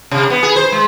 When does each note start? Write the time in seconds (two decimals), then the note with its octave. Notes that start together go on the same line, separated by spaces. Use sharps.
0.11 C3
0.30 B3
0.43 G#4
0.56 C5
0.72 G#3